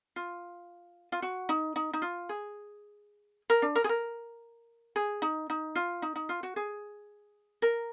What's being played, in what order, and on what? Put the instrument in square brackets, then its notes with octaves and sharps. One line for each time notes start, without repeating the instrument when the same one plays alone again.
[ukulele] F4
F4
F#4
D#4
D#4
D#4
F4
G#4
A#4
D4
A#4
G#4
A#4
G#4
D#4
D#4
F4
D#4
D#4
F4
F#4
G#4
A#4